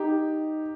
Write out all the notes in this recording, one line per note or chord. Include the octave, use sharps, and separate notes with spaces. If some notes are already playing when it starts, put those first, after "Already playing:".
Already playing: D#4 G4